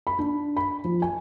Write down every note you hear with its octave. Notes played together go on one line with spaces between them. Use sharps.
B5
D4
B5
F3
G#5